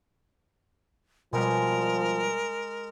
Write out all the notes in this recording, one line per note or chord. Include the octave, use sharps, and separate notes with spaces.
B2 F3 G3 G#3 A#4